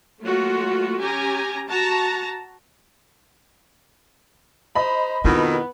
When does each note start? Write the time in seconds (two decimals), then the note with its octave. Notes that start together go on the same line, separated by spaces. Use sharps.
0.21 F#3 A3 A#3 F4 F#4
1.00 C#4 G4 G#5 A#5
1.67 F#4 A5 A#5
4.75 C5 D#5 A#5 B5
5.25 F2 B2 D#3 B3 E4 B4